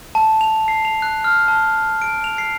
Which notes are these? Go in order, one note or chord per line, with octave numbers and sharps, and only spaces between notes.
A5
F7
C7
F7
F#6
F6
A5
D7
F7
C7